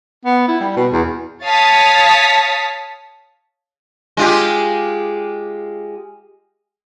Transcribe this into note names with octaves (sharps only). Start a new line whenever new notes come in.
B3
E4
G3
B2
E2
C#5 F5 A5 D#6 A6 B6
G#3 F4 G4